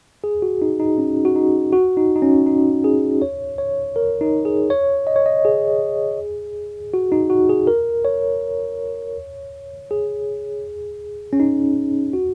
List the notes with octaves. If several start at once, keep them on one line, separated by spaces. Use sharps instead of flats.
G#4
F#4
D#4
D#4
C#4
F#4
D#4
F#4
D#4
D#4
C#4
D#4
G#4
C#5
C#5
A#4
D#4
G#4
C#5
D#5
C#5
D#5
G#4
F#4
D#4
F#4
G#4
A#4
C#5
G#4
C#4
D#4
F#4